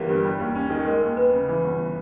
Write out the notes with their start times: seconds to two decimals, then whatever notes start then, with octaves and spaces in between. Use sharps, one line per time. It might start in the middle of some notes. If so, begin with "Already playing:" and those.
Already playing: G1 E3 A#3 G4
0.09 G2
0.24 G3
0.39 D#2
0.55 C#4
0.70 D#3
0.86 G#3 A#4
1.02 D#2
1.17 B3 B4
1.33 C#3
1.49 E3
1.64 G1